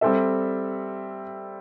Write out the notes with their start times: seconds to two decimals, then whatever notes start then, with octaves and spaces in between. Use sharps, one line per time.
0.01 G3 C4 A4 E5